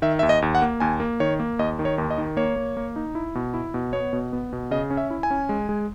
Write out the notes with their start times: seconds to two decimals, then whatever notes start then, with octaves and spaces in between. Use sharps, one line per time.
0.02 D#3 E5
0.19 D#2 E5
0.29 D#5
0.42 D#2
0.55 F#5
0.62 A#3
0.80 D#2 G#5
1.00 A#3
1.20 D#3 C#5
1.40 A#3
1.59 D#2 D#5
1.79 D#3
1.85 C#5
1.98 D#2
2.10 D#5
2.18 D#3
2.37 A#3 C#5
2.56 A#3
2.77 A#3
2.96 D#4
3.15 E4
3.35 B2
3.54 E4
3.74 B2
3.93 B3 C#5
4.13 B2
4.33 B3
4.53 B2
4.71 C#3 D#5
4.90 C#4
4.97 E5
5.10 E4
5.23 G#5
5.31 C#4
5.49 G#3
5.69 G#3